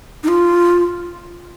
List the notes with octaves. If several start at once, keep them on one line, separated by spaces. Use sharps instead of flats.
D#4
F4